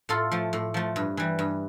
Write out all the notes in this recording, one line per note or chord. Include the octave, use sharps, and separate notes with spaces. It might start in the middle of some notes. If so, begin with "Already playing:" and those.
A2 F4 A4
F3 A3
A2
F3 A3
G2
E3 G3
G2